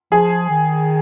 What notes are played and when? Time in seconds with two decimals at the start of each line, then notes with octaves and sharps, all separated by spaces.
0.12 F3 G#4
0.50 D#3